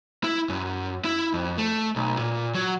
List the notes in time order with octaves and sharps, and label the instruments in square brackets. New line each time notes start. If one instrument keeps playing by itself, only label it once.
[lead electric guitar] E4
F#2
E4
F2
A3
B1
A#2
F#3